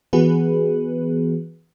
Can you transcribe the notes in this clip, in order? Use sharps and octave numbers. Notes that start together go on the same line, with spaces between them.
E3 B3 F#4 G#4 B4